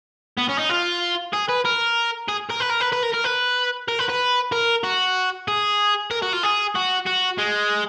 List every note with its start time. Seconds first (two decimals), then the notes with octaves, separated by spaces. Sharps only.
0.37 B3
0.49 C#4
0.58 D#4
0.69 F4
1.33 G#4
1.49 B4
1.65 A#4
2.29 G#4
2.50 A#4
2.61 B4
2.70 A#4
2.81 B4
2.93 B4
3.03 A#4
3.14 A#4
3.25 B4
3.88 A#4
3.99 B4
4.09 B4
4.52 A#4
4.84 F#4
5.48 G#4
6.11 A#4
6.22 F#4
6.33 F4
6.43 G#4
6.75 F#4
7.07 F#4
7.39 G#3